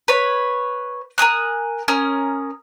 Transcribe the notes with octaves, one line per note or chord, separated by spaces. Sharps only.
B4 C#5
A#4 G#5 D#6 F#6
C#4 A#4 D#6 F6